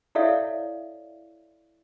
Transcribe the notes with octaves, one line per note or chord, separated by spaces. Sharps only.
E4 A4 C#5 D5 E5 F5